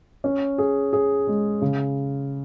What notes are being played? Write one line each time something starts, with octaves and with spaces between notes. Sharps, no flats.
C#4
G#4
G#4
G#3
C#3